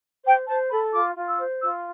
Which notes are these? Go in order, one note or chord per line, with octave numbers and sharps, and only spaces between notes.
C5 G5
C5 A5
A4 B5
F4 D6
F4
E6
C5
F4 E6